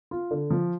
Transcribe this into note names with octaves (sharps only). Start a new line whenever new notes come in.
F4
D3
F3